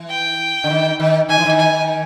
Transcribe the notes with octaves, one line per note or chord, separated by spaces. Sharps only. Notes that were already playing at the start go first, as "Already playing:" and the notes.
Already playing: E3
G5
D3
D#3
D#3
D#3 G#5
E3
D#3
G#5